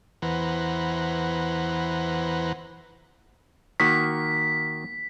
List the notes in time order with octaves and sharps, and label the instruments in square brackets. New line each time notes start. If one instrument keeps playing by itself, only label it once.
[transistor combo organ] E2 E3 B4 C5 F#5 A#5
[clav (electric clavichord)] D#3 A#3 F#4 [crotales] B6